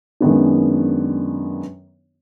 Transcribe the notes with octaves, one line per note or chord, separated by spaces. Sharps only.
F#2 D#3 G#3 B3 D4